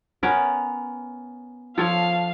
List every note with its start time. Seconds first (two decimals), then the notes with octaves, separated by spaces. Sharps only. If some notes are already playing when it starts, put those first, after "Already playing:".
0.23 B3 C#4 A#4
1.78 F3 A4 C#5 F5